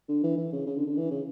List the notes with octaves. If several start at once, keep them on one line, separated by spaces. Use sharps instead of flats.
D3
E3
E3
C#3
C#3
D3
D3
E3
C#3